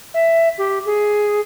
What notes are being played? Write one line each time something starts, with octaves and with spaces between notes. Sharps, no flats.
E5
G4
G#4